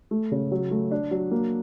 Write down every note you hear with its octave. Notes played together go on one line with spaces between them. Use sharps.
A3
C#3
F#3
A3
D4
F#3
A#3